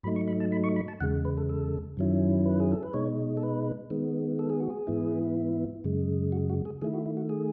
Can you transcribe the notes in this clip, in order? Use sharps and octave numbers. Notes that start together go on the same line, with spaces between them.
G#2 F#3 A3 D#4 B5
C#6
B5
A5
B5
C#6
B5
A5
E2 C#3 G#3 F#5
B4
A4
A4
F#2 D#3 F#3 C#4 E4
B4
G#4
A4
B4
B2 G#3 D#4 C#5
A4
B4
D#3 G#3 B3
A4
G#4
F#4
G#4
G#2 E3 B3 E4
F#2 C#3 G#3
F#4
F#4
G#4
D#3 A3 E4 G#4
F#4
E4
F#4
G#4